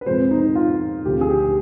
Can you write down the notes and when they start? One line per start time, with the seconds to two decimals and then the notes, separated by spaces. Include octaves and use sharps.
0.01 B4
0.06 F2 C3 F3 G#3 C5
0.31 D#4
0.55 F4
1.05 D2 C3 F3 G4
1.21 G#4
1.30 G4